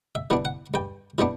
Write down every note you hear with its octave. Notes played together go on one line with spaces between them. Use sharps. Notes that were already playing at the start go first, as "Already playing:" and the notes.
E5
E3 G3 B3 D4
F#5
G2 G5
E3 G3 B3 D4